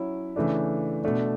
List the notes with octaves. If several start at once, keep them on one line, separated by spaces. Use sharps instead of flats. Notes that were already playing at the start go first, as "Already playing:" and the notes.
Already playing: F#3 C#4 E4
C#3 E3 A3 D4
B2 A3 D4